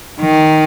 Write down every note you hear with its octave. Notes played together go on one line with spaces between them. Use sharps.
D#3